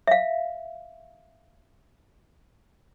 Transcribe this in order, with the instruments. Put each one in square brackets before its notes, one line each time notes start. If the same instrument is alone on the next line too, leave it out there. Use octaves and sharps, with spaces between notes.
[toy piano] E5 F5